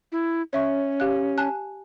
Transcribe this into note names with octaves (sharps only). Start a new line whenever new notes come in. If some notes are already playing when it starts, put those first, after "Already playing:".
E4
C#4 C#5 E5 C#6
G4 F5 F#6
G#5 A5 F#6